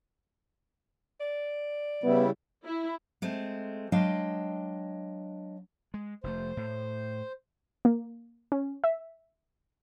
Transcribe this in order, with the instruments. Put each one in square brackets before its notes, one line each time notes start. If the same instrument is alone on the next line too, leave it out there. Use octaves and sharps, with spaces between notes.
[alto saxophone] D5
[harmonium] C#3 G3 E4 [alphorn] B3
[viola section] E4
[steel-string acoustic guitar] G#3 A3 C4
F#3 G#3 D4 D#5 F5 G5
[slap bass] G#3
[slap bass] F1 A2 A3 [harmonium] C5
[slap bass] A2
[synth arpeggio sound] A#3
C#4
E5